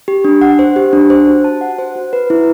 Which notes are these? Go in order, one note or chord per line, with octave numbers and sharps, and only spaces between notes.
G4
D4
F#5
C5
G4
D4
C5
F#4
A5
F#5
C5
F#4
B4
E4